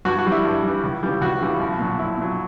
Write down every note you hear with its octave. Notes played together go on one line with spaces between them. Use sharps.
G2 F#4
F#4
E3 G3
E4
G2
E3 G3
C#2
C#3 E3 G3
C#2 F#4
C#3 E3 G3
B1
A#2 F#3
B1 E4
A#2 F#3